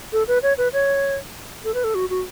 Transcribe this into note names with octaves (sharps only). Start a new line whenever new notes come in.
A4
B4
C#5
B4
C#5
A4
B4
A4
F#4
F#4